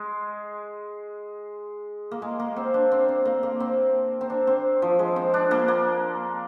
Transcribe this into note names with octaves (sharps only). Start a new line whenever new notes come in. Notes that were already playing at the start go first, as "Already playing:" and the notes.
Already playing: G#3
A#3
G#3
A#3
C4
D4
C4
C4
A#3
A#3
C4
C4
D4
C4
F3
G#3
C4
D4
A#3
A#3